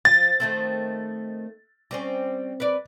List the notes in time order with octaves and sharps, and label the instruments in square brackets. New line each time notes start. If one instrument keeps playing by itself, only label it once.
[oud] F3 [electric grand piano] A6
[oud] D#3 A3 C4
G3 C4 C#4
B4 D5